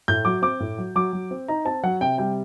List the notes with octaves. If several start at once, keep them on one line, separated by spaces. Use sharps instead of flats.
A2 G6
F#3 D6
C4 D6
A2
F#3
F#3 D6
F#3
C4
D#4 A#5
C4 A5
F#3 F#5
C3 G5
G3 G5